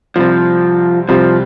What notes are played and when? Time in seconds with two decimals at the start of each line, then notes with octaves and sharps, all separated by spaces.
0.16 C2 C3 F3 G3 C4
1.08 C2 C3 F3 G3 C4